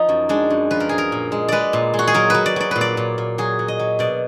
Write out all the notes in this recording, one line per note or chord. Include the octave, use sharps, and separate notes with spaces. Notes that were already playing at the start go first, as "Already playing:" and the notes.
Already playing: F3 D#4
F#2
G#3 D4
F#2
F3 B4
A#4
F3 G#4
A#4
A#2
G#3
G#3 B4 D5
A#2
G#3
F#4
G#4
F#3 A#4
F#3 B4
D5
F#3 D5
A#2 B4
D5
A#2
A#2
F#3 G#4
F#3
D#5
F#3
B2 D5